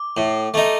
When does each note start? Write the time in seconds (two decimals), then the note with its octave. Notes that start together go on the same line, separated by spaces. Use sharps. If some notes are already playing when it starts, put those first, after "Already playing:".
Already playing: D6
0.17 A2
0.54 A3 D#4